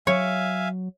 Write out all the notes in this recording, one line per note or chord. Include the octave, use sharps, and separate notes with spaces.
F#3 C#5 E5 F5 G#5